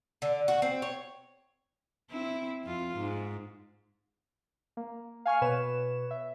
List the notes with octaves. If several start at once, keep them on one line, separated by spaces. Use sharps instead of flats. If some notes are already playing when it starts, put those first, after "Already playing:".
D3
F#4
C4
C#5
C4 E4
F2 F4
G#2
A#3
F5 G#5 C#6 F6
B2 B4 C#5 E7
E5